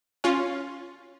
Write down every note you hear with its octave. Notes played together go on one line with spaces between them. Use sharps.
C#4 F4